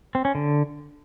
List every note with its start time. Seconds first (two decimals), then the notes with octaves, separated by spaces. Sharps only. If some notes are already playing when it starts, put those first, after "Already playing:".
0.15 C4
0.25 C#4
0.35 D3